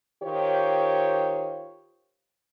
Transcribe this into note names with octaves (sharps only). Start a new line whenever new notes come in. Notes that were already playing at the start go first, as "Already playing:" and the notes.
D#3 F4 G4 C5 C#5